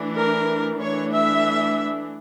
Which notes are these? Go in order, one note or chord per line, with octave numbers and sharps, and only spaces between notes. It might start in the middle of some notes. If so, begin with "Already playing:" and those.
Already playing: E3 A3 D4
A#4
E3 A3 D4 C#5
E5